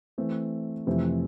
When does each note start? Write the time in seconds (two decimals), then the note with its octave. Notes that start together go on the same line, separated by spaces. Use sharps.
0.18 E3 A3 C4
0.87 F2 C3 E3 A3 C4